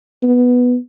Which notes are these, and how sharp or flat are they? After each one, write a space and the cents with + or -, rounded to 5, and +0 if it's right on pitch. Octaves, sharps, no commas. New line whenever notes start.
B3 +0